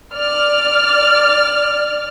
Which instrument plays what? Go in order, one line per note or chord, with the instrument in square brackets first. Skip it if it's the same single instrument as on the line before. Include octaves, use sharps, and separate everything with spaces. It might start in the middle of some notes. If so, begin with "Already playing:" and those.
[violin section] D5 F6